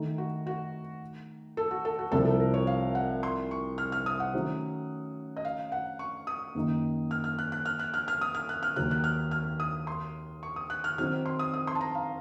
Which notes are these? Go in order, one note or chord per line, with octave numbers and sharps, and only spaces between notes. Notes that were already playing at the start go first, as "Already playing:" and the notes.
Already playing: D#3 A3 D#4
F#4
F#4
A4
F#4
A4
F#4
C2 C3 F3 A4
A4
A#4
C#5
F5
F#5
C6
C#6
F6
F6
D#6
F#5
D#3 F#3 A3 C#4
D#5
F5
F#5
C#6
D#6
F#2 D#3 A#3 D#4
F6
F6
F#6
F#6
F6
F#6
F6
F6
D#6
F6
F#6
F6
D#2 D#3 F#3 F#6
F#6
F6
F6
D#6
C6
C#6
D#6
F#6
F6
D#3 F#3 C4 D#4 F#4 F6
C6
D#6
D#6
C6
A5
A#5
F5